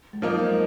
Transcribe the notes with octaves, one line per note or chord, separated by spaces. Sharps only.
G#3
F3 F#3 A#3 D#4
G#3